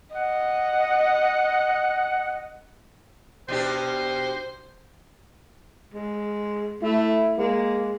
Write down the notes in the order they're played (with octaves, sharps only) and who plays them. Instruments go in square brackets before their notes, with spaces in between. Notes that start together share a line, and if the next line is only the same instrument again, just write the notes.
[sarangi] D#5 [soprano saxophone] F#5
[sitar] B2 D4 G4 [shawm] C5
[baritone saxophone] G#3
[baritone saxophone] A3 [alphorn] E4
[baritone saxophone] G#3 [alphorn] A#3